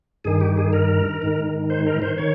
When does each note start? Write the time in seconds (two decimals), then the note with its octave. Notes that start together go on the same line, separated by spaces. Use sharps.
0.24 G2 D#3 G#4
0.41 G4
0.57 G#4
0.73 A#4
1.22 G#2 D#3
1.70 C5
1.87 A#4
2.02 C5
2.18 D#3 C#5